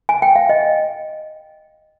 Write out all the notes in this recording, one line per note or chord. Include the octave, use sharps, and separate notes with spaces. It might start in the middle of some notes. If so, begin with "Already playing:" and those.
G#5
G5
F5
D#5